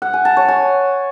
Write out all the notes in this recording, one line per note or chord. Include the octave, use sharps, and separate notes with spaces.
F#5
G#5
A5
C#5
G#5